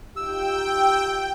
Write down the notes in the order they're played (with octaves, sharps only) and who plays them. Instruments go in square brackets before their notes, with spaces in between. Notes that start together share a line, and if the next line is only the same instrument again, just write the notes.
[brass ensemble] D#4 F4 G4 [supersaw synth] G5 [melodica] E6